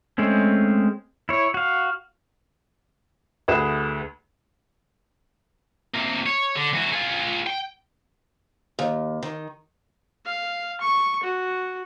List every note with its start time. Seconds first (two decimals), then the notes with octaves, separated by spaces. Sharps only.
0.18 G#3 A3 C4 C#4
1.29 E4 C#5
1.54 F#4 F5
3.48 D2 G#4 B4 E7
5.94 C3 A#3
6.26 C#5
6.56 D3
6.74 E3 F#4
6.92 F4 G#4
7.47 G5
8.79 D#2
9.23 D#3
10.25 F5
10.81 C#6
11.23 F#4